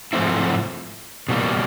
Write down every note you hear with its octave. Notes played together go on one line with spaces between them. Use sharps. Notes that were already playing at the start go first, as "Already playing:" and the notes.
G#2 F3 A3 C4 E4
B2 G3 A#3